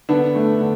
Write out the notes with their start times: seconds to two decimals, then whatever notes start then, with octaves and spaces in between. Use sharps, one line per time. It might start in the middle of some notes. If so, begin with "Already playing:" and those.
0.09 D3 B3 D4
0.35 A3
0.60 D3